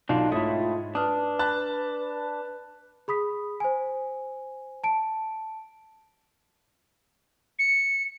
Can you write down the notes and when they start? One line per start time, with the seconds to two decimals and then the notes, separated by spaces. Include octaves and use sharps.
0.09 B1 D4 D#4 F4
0.32 G#2 A3 E4 F4 C#5 D#6
0.95 D4 B4 D#6 F6
1.39 A5 B5 F#6
3.08 G#4 B5 D#6 B6
3.60 C5 G#5
4.84 A5 D7
7.59 C#7